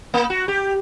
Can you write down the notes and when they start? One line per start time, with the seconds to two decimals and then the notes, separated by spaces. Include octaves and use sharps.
0.14 A#3
0.30 F#4
0.48 G4